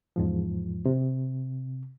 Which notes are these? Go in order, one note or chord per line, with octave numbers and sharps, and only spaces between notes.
E2 G#2 F3
C3